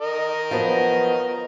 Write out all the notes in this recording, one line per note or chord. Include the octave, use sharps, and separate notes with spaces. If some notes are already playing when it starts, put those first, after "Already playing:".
A#4 D#5
F3 F#3 B3